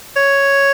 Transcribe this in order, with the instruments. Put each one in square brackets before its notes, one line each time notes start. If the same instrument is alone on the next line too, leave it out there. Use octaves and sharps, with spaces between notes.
[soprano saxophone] C#5